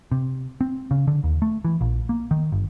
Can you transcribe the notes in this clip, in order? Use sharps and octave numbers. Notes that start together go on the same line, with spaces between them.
C3
C4
C#3
D3
D#2
A3
E3
A#1
A#3
D#3
G1